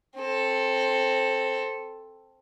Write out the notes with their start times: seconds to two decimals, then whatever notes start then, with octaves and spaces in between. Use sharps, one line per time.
0.16 C4 A4